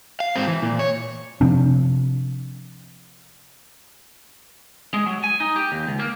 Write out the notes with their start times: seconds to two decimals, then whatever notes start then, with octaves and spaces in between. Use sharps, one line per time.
0.20 F5
0.36 G#2 C4
0.48 E3
0.62 A#2
0.79 C#5
1.41 C3 F3 C4 D4
4.94 G#3
5.06 F#3
5.24 G#5
5.40 D#4
5.56 G4
5.72 D#2
5.87 C#2
6.00 A#3